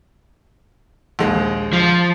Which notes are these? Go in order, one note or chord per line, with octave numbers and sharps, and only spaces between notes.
A#1 D#2 G#3
F3